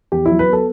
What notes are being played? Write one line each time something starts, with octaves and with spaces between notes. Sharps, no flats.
E2 G4
F#3 E4
B4
B3 A4